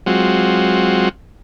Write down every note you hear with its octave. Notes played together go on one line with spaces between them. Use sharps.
F#3 G#3 C4 F4 F#4